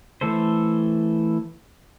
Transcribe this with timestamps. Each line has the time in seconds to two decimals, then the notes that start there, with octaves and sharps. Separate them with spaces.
0.21 E3 A3 A4 C5